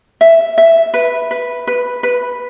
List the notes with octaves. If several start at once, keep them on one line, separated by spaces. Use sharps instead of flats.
E5
E5
B4
B4
B4
B4